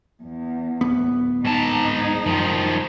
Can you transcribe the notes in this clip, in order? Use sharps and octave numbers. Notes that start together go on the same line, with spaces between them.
E2
D1 B3
G#2 D#4 A5
F#2 D#3 F3